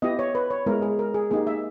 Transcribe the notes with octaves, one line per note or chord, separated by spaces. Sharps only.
B3 E4 G4 D#5
C#5
B4
C#5
G#3 B3 E4 A#4
G#4
A#4
G#4
A#3 D#4 G4 G#4
E5